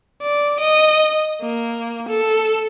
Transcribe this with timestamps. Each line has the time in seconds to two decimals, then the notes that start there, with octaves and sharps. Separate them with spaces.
0.22 D5
0.60 D#5
1.42 A#3
2.09 A4